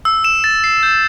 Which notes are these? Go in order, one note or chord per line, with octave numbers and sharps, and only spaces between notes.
E6
E7
A6
C7
G6